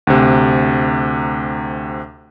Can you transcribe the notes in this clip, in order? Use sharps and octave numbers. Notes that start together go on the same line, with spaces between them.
D2 C3